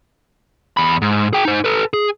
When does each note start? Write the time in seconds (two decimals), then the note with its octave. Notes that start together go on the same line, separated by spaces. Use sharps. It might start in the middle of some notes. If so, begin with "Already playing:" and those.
0.77 E2 B5
1.02 G#2
1.33 G#4 G5
1.45 D#4 C5
1.64 A4 B4
1.93 G#4